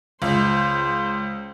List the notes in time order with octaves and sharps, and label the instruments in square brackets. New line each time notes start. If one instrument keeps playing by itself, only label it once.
[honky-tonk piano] C#2 [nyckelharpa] C5